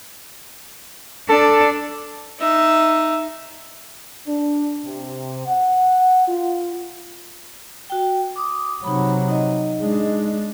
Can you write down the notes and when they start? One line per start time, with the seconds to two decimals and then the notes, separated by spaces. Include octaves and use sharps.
1.29 D4 A4
2.40 D#4 E5
4.27 D4
4.84 C3
5.46 F#5
6.28 F4
7.90 F#4 G5
8.36 D6 D#6
8.84 C3 F#3 D#4 B5
9.28 D#4 D#5
9.81 G#3 D4